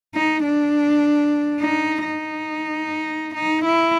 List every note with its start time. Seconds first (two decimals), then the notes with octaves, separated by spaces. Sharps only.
0.15 D#4
0.44 D4
1.61 D#4
2.04 D#4
3.35 D#4
3.65 E4